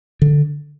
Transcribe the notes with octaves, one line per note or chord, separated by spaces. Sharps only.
D3